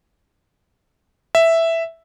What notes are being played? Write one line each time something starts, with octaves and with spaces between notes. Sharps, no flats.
E5